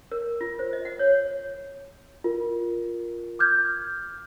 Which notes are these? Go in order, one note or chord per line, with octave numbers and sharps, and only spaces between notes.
A#4
F4
C5
D#5
F#5
C#5
F4 A#4
D6 F6 G6 G#6